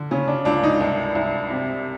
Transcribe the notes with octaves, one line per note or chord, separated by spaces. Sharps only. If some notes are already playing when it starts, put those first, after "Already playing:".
Already playing: D3
C#3 C#4
D4
C#2 D4
D#4
C2 D4
C2
C3